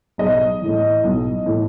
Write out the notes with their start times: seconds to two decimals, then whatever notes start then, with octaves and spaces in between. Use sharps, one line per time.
0.18 B1 D#5
0.62 A2 E3
1.04 B1
1.46 A2 E3